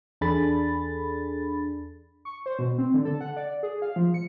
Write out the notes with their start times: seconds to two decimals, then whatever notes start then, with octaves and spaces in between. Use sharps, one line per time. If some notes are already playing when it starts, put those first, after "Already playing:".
0.21 E2 D4 G#4 A4 B5 A6
2.25 C#6
2.46 C5
2.59 B2
2.78 C4
2.94 D3
3.05 A4
3.21 F#5
3.37 D5
3.63 G#4
3.82 F5
3.96 F3
4.14 C#7